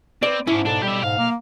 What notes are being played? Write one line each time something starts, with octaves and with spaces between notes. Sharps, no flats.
C4 B4 D5
G#2 C#4 D4 E4
B1 D4 A4
G3 G4 E5
G#2 F5
A#3